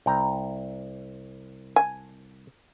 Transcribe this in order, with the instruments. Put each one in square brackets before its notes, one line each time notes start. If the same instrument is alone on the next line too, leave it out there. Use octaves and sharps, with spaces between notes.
[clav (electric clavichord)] C2 G5 A#5
[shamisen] G#5